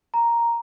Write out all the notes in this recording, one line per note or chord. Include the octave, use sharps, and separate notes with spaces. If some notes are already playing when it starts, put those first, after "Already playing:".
A#5